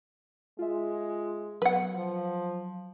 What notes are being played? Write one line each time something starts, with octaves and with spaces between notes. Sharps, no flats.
G#3 F4 E5
B2 F#3 B4 F#5
F3